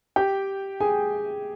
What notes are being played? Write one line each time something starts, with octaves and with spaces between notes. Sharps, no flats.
G4 G5
G#4 G#5